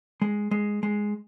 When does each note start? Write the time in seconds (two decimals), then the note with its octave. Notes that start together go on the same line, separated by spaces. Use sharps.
0.22 G#3
0.51 G#3
0.83 G#3